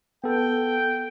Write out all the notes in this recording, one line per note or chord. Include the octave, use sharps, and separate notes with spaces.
B3 A4 G5